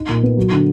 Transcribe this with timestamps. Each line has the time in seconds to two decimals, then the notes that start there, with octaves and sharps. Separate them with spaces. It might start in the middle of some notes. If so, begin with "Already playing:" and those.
Already playing: D#4
0.09 A#2
0.23 B3
0.37 F#3
0.52 D3